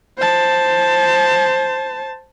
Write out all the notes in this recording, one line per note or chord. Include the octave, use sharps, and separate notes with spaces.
C5 A5